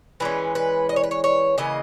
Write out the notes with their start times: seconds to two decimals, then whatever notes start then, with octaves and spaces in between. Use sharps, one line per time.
0.20 E3 G#3 C#4 B4
0.55 B4
0.89 D#5
0.96 C#5
1.03 B4
1.11 C#5
1.24 C#5
1.58 C#3 E3 A#3 D#5